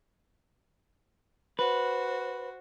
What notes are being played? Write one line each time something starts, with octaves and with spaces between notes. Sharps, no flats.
F#4 B4 C5